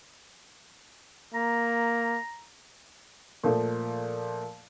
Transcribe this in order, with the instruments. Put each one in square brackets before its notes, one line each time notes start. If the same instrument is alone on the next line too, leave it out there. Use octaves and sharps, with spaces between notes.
[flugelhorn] A#3 [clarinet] A#5
[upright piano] A#2 F3 A3